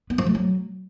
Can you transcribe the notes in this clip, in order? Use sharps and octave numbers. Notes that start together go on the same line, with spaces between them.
B3
F3
A3
F#3